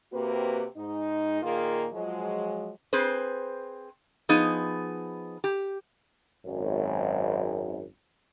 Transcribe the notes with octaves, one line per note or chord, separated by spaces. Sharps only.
C3 A#3 C4 F#4 B4
G#2 D#4
A#2 D#3 A#3 F4 G#4 A#4
F3 F#3 G#3
C4 G#4 B4 C5
F3 B3 D#4 G#4
G4
G#1 F#2